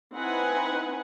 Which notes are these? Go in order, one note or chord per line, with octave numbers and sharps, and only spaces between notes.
C4 D#4 E4 B4 F#5 G#5